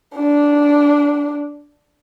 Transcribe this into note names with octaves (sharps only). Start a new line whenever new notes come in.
D4